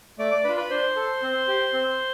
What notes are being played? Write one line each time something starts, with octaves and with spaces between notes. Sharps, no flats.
A3 D5 D6
D5 D6
D4 F4 B4 B5
B4 B5
D4 C5 C6
A4
C4
G4
C4